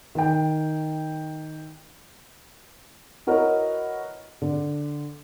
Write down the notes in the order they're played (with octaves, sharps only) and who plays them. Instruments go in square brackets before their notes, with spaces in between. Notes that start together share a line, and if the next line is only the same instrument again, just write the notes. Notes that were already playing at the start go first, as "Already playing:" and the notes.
[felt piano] D#3 G5
[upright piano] E4 F#4 A#4 B4 C#5 D#5
D3